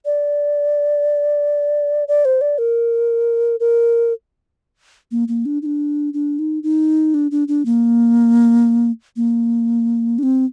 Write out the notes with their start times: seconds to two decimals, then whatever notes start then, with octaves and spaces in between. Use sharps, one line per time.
0.05 D5
2.08 D5
2.25 C5
2.41 D5
2.58 A#4
3.60 A#4
5.11 A#3
5.28 A#3
5.46 D4
5.62 D#4
5.66 D4
6.14 D4
6.39 D#4
6.63 D#4
7.14 D4
7.31 D4
7.48 D4
7.65 A#3
9.16 A#3
10.19 D4
10.23 C4